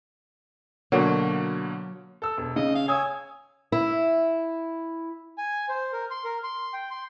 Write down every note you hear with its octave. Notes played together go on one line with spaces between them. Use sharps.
B2 D3 F#3 A#3
A4 E6
E1
C#3 D#5
F5
C#5 G#5 D#6 E6
E4
G#5
C5
A#4
C6
A#4
C6
G5
C6